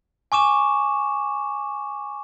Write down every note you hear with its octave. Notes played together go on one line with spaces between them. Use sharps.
G#5 C#6 D6 E7